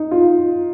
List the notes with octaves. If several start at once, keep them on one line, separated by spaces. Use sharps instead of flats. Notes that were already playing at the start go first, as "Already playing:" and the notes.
Already playing: D#4
F4